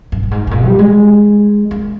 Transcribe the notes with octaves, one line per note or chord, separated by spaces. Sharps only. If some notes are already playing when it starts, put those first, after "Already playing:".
G2
G2
G#2
G#2
A#2
G3
G#3
A#3